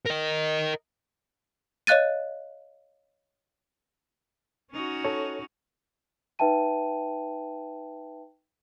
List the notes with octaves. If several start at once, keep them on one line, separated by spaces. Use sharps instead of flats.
A#4 D#5
C#5 D#5 F5 F#6 A6 D#7
C#4 D#4 F#4
A4 C#5
D#4 B4 E5 G5 A5 D#7